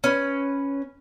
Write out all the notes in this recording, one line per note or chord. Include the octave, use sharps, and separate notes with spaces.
C#4 B4